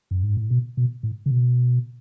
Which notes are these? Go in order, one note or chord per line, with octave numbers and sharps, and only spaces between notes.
F#2
G#2
A2
B2
B2
A2
C#3
B2